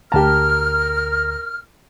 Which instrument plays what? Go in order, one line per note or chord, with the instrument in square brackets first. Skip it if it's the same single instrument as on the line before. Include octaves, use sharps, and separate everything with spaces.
[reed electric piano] D2 A#5 [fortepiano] G4 A5 [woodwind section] A#4 F6